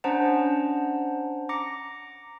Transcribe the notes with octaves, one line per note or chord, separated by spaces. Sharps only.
C#4 D4 C5 F#5 A5 A#5
A#5 D6 A#6 C#7